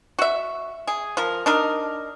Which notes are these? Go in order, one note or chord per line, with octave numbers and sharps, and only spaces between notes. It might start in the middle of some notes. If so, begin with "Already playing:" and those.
F#4 E5
G#4
F3 A#4
D4 D#4 A#4